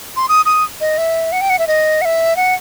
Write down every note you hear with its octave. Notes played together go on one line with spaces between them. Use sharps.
C6
D#6
D#6
D#5
E5
F#5
G5
F#5
E5
D#5
F#5
E5
F#5